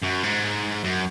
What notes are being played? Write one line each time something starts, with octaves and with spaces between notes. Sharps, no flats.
F#2
G#2
F#2